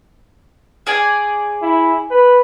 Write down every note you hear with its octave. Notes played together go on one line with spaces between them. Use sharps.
G#4 D5 G#5
E4
B4